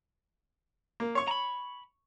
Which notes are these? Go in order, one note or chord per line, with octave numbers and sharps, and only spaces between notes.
A#3
C#5 C#6
A#5 B5